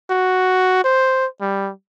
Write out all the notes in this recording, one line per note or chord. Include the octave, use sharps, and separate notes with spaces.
F#4
C5
G3